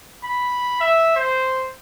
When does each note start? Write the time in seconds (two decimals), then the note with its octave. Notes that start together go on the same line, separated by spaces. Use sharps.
0.24 B5
0.81 E5
1.16 C5